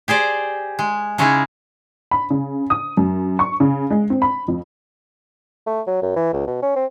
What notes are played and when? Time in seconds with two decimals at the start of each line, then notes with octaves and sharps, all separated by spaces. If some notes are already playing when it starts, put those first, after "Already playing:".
0.08 G4 G#4 C5 D5
0.79 G#3
1.18 C#3 G#3 C#4 D#4 E4 G#4
2.11 B5
2.30 C#3
2.70 D#6
2.97 F#2
3.39 C#6
3.60 C#3
3.90 G#3
4.10 C4
4.22 B5
4.48 F2
5.67 A3
5.87 F#3
6.02 F#2
6.16 E3
6.33 C#2
6.47 B2
6.63 C#4
6.76 C4